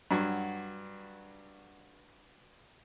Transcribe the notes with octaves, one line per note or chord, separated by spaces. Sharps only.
G2 F#3 F#4